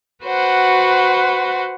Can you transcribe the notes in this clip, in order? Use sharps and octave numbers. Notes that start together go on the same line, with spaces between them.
F#4 B4 C5 F#5